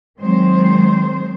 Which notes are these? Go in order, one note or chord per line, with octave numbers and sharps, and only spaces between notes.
D#3 F#3 G#3 C4 C5